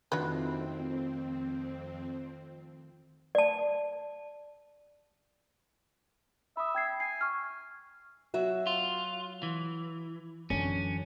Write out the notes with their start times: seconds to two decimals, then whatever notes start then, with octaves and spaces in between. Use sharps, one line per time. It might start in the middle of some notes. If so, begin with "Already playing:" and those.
0.12 F2 D#3 F#3 A3 C4 D4 F4 B4
3.35 D5 A5
6.57 E5 B5 D#6
6.75 G5 G#6 C7
7.00 G#5 C7
7.21 C#6 F6
8.34 F#3 F#4 E5
8.67 F4
9.43 E3
10.50 F#2 D3 E3 C#4